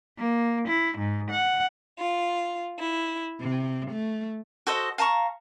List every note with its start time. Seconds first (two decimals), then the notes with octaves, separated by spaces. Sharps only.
0.17 A#3
0.67 E4
0.98 G#2
1.29 F#5
1.98 F4
2.79 E4
3.41 C3
3.91 A3
4.67 F#4 A4 C5 D#5
4.98 F5 A5 A#5 C#6